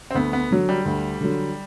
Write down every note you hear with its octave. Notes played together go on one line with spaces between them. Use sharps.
C4
D2 B3
B3
D3 F#3
G3
D2
D3 F#3